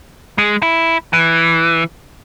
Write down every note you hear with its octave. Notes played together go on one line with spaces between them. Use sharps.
G#3
E4
E3